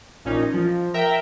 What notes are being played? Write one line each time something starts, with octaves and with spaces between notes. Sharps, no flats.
A#1 A#2 C#4 D#4
F3
A#4 E5 G5 A#5